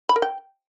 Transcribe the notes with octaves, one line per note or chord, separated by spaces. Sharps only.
B5
A#4
G5